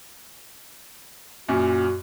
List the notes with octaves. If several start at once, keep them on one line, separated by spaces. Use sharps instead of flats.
F#2 A#2 F#4